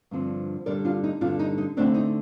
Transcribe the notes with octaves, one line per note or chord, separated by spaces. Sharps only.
G2 D3 F3 C4
G2 D3 G3 A#4 D5
D4 F4
D#4
G2 D3 G3 D4 F4
D#4
D#4
D3 A3 C4 D4
D#4